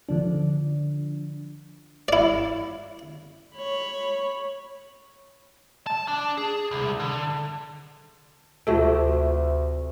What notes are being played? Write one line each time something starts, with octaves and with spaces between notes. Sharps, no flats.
D3 F3 D4
E4 D5
C#5 B5
A5
D4
G#4
C2
D3
D2 C3 A3 F4 F#4 A4